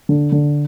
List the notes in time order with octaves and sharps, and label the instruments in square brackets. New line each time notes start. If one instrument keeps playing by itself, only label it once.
[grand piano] D3
D3